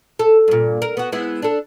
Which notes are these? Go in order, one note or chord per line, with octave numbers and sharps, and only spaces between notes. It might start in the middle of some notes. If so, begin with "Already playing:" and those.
A4
G2 A#2
A#4
B3 F#4
G#3 B3 E4
D4 A4